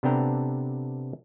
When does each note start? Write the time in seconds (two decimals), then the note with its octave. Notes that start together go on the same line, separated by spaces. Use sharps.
0.03 C3 B3 D4 A4 G5 A#5